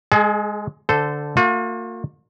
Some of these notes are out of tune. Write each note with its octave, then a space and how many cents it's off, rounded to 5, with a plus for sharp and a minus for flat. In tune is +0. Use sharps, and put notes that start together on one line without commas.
G#3 +0 G#4 +45
D3 +0 A4 +0 C5 -20
A#3 -40 F4 +45